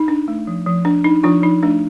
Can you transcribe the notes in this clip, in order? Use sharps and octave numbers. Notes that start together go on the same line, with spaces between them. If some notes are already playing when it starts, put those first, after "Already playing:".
Already playing: D#4
D4
A3
F3
F3
D4
D4 D#4
F3 D4 F4
F3 D#4
A3 D4